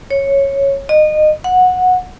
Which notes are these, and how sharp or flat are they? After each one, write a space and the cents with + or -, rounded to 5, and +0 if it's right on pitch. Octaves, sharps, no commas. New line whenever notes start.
C#5 -5
D#5 -25
F#5 -15